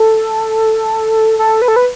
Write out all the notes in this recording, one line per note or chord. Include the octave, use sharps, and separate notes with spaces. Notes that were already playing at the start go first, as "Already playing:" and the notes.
Already playing: A4
A4
B4
A4
B4